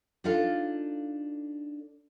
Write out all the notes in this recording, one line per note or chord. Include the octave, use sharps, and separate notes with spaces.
D4 D#4 F4 A4 F5